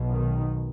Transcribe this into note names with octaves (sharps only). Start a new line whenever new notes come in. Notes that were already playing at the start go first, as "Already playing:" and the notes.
Already playing: B1 B2
D#3